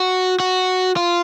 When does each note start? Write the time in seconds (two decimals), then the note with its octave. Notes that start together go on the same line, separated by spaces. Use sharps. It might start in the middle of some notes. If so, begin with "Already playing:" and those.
Already playing: F#4
0.40 F#4
0.97 F4